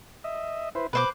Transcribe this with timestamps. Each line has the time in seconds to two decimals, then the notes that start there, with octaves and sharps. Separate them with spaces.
0.24 D#5 E5
0.75 E4 B4 C5
0.93 B2 B4 C5 D6